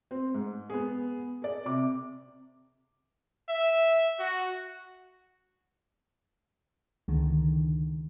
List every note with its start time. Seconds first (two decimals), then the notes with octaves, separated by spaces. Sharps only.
0.11 C4
0.34 G#2
0.70 B3 G#4
1.42 G#4 D5
1.65 C3 D6
3.49 E5
4.19 F#4
7.08 C#2 D3 D#3